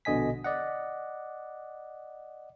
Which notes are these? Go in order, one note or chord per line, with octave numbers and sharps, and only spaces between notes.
A#1 B2 D3 D#5 G#5 B6
D5 D#5 F#5